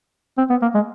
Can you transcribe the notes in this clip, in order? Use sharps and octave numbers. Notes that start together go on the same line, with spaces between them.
C4
B3
A#3
G#3